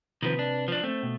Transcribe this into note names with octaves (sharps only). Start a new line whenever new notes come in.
C3 D#3 F3 B4
D4
F3 D4
A3 C4
B2